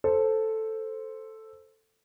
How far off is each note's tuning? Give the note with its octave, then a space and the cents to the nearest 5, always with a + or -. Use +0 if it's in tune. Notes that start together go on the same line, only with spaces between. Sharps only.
A4 +0 C5 +0